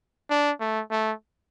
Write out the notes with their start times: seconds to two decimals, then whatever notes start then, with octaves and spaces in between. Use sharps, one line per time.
0.30 D4
0.60 A3
0.91 A3